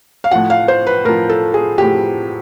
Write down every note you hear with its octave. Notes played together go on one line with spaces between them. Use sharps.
F5
A2 F3 F#5
F5
C5
B4
A2 F3 A#4
A4
G#4
A2 F3 G4